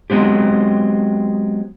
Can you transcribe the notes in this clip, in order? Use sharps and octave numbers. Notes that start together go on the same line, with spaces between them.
F#3 G#3 B3 C4 G4